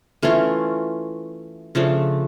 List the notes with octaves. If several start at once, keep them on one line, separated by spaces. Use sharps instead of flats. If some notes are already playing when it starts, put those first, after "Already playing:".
E3 A3 C#4 F4
C#3 F3 A3 D4